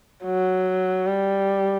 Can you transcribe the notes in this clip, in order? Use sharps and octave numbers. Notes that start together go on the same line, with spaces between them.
F#3
G3